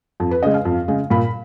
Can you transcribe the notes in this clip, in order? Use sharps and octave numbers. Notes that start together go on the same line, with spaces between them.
F2
B4
C#3 G#3 D#5
F5
F2
C#3 G#3
A#2 B5